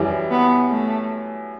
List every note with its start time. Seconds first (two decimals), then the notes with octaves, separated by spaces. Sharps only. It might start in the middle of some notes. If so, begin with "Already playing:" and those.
Already playing: F#2 E3 G3
0.31 B3
0.70 A3